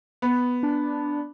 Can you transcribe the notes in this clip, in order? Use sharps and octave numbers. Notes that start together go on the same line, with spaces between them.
B3
D4